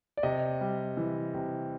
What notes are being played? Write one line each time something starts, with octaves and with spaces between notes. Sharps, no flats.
D5
C3 D#5
G3
E3
C3